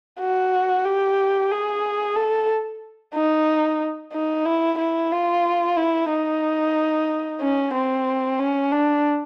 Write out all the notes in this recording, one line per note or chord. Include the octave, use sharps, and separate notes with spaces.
F#4
G4
G#4
A4
D#4
D#4
E4
E4
F4
E4
D#4
C#4
C4
C#4
D4